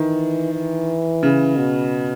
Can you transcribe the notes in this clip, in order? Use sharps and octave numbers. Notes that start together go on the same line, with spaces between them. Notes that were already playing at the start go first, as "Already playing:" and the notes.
Already playing: D#3 E3
E3
C#3
B2